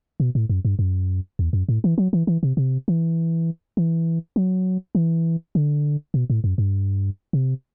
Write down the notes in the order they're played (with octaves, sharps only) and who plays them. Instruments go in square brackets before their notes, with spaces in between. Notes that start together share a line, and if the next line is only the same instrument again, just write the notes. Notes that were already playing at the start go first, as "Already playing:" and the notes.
[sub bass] B2
A2
F#2
G2
F#2
E2
F#2
A2
E3
F#3
E3
E3
C3
C3
E3
E3
F#3
E3
D3
B2
A2
F#2
G2
C3